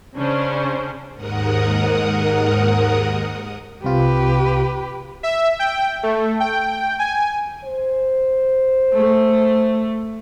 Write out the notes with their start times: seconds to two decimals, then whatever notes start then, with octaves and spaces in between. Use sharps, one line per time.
0.17 C#3 C#4 D4 C5
1.14 D#2 G#2 A#4 F#5 D#6
3.85 C2 C3 F4 G4 B4
5.23 E5
5.59 G5
6.03 A3
6.40 G5
6.99 G#5
7.65 C5
8.96 A3